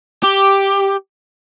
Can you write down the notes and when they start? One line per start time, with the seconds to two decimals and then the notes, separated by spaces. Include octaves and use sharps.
0.24 G4